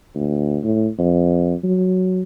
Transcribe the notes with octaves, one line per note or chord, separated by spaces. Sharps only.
D2
A2
F2
F#3